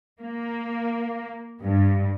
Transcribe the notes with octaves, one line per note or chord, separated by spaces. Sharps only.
A#3
G2